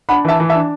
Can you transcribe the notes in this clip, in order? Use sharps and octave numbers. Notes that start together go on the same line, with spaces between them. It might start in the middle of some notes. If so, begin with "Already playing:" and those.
D4 F#5 B5
E3 E5 A5
E3
E5 A5
D4